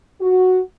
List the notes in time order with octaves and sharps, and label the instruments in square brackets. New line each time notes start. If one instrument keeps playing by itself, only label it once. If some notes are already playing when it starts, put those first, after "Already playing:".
[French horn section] F#4